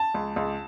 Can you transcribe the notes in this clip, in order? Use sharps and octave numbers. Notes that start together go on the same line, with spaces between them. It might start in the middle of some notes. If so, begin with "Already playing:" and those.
Already playing: A5
C#2
C#2